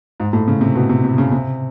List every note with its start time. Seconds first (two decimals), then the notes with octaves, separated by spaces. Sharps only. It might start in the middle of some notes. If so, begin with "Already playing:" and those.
0.20 G#2
0.33 A2
0.48 C#3
0.61 C3
0.75 B2
0.90 C3
1.04 C3
1.18 C#3
1.32 C3